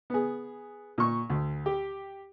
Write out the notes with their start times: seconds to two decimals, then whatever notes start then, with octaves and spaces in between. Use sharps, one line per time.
0.10 B3 G#4
0.98 A#2 C#6
1.30 D2
1.66 G4